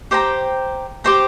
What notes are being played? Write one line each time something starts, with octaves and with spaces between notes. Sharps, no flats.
G4 C5 G5 A#5
G4 C5 G5 A#5